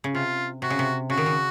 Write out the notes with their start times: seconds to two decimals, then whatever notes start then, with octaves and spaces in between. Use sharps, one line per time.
0.04 C#3
0.14 C3 F4
0.62 C3 F#4
0.70 C#3
0.79 C3
1.10 C#3 F#4
1.17 D#3
1.26 C#3